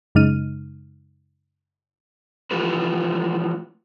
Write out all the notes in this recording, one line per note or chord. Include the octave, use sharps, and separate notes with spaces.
F#2 C#3 G#3 D#4 F6 D#7
E3 F3 A3 F4 G4 B4